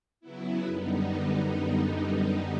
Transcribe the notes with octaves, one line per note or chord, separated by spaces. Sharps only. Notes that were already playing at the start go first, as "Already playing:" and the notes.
C#3 F#3 B3 E4
F#2 D3 G3 B3 D#4